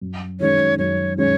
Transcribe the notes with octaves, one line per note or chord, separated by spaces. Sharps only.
F#2
D#3 G#3 C#4 C#5
F#2 C#5
D#3 G#3 C#4 C#5